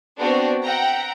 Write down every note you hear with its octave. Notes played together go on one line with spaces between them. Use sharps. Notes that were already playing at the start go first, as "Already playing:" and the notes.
B3 C4 D4 F#4
E5 F#5 G5 A#5